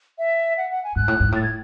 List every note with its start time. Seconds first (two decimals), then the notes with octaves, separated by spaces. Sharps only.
0.19 E5
0.58 F#5
0.71 F#5
0.84 G#5
0.96 G#2 F#6
1.08 A2
1.20 G#2
1.32 A2 A6
1.43 G#6